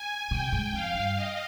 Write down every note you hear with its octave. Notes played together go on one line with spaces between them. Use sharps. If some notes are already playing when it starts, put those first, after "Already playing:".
Already playing: G#5
C3 G5
G#2
F2 F5
G2
D#5